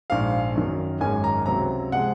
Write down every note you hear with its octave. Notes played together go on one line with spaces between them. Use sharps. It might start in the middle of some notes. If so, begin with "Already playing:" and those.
A#1 G#2 F3 F5
F#2 D#3 F#3
G#1 F#2 D#3 G#3 C#4 G#5
A#5
C#2 C3 F#3 C4 A#5
C3 F3 G#3 F#5